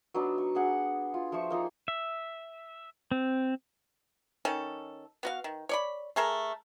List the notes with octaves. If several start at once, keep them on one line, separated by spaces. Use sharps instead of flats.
F#3 B3 D4 D#4
C#6
D4 G#4 F#5
F4
F3 C5 E5 C#6
A#3 D#4 F4
E5
C4
D#3 C#4 A4
B3 F#4 F5
D#3
C#5 D5 B5
A3 G#4 A#4 A5